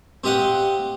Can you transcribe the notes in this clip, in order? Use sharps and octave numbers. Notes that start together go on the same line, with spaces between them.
C4 G4 D#5 F5 F#5